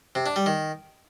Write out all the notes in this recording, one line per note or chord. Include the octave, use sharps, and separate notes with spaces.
C3
D4
G3
D#3